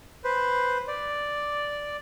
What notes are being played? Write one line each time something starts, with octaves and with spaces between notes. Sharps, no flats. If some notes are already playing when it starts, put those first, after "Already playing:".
B4 C5
D5